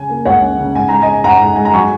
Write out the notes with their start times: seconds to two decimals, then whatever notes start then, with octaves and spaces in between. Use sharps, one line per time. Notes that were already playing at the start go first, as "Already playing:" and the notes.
Already playing: C#3 C#4 G#5
0.09 A#3
0.25 C#2 C#5 F#5
0.42 C#4
0.58 C#3
0.75 G#2 G#5
0.89 G#3 A#5
1.02 D#5 G#5
1.08 D#4
1.24 G#2 F#5 A#5
1.41 G#2
1.56 G#3 G#5
1.65 A#5
1.74 F#3 G#5 C#6